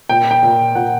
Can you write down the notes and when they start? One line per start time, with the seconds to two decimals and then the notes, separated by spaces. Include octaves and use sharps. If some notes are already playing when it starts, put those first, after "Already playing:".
0.09 A#2 G5
0.31 G5
0.43 A#2
0.75 A#2 F#5